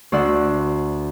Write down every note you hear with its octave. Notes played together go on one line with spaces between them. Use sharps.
D2 C5 D5 F#5 E6 F#6